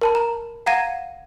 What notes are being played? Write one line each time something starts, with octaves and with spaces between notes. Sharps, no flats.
A#4 A5 B5
A#5
F5 F#5 A#5 G#6 A#6 D#7